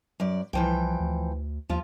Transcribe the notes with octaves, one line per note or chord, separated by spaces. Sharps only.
F#2 D5
C2 E3 F3 G5
D2
D#2 F3 F4